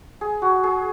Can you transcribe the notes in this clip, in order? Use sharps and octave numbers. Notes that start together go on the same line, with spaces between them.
G#4
F#4
G#4